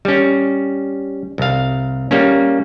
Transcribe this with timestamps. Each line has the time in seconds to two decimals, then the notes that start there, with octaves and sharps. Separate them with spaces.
0.05 G3 C#4
1.38 C2 F5
2.11 G3 A#3 C#4